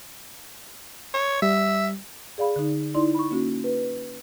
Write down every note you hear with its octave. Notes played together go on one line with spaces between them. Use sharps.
C#5
G3 E5
G#4 D5 F5 B5
D3 D#4
D#4 E4 D5 C6
B5 C#6
A#3 C#4 F#4
B4